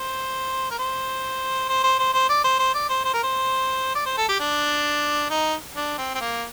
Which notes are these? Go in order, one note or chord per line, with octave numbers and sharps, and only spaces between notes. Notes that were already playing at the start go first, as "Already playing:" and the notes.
Already playing: C5
A#4
C5
C5
C5
C5
C5
D5
C5
C5
D5
C5
C5
A#4
C5
D5
C5
A4
G4
D4
D#4
D4
C4
C4
A#3